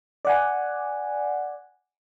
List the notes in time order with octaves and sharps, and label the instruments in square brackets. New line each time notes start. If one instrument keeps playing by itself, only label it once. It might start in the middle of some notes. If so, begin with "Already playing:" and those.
[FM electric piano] D5 F#5 G#5